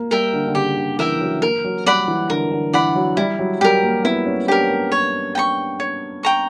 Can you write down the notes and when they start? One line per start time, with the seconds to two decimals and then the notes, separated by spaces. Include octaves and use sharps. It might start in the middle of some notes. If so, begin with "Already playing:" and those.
Already playing: A#3
0.11 G3 A#4 E5 G5
0.33 D3
0.47 D3
0.55 C#3 G4
0.77 D3
0.99 E3 A#4 E5 G5
1.16 E3
1.21 F#3
1.42 A#3 A#4
1.64 F#3
1.86 G3 D5 F#5 B5
2.08 E3
2.30 D3 A#4
2.52 D3
2.73 E3 D5 F#5 B5
2.95 F#3
3.17 G3 E4
3.39 F#3
3.61 G3 G4 A#4
3.83 A#3
4.05 B3 E4
4.26 C#4
4.48 D4 G4 A#4
4.70 A#3
4.92 C#5
5.35 G5 A#5 C#6
5.80 C#5
6.23 G5 A#5 C#6